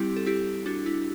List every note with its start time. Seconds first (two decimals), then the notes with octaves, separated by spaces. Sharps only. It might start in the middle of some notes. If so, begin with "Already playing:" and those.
Already playing: G3 C4 E4 G4
0.16 A4
0.26 E4 G4
0.66 D4 F#4
0.86 E4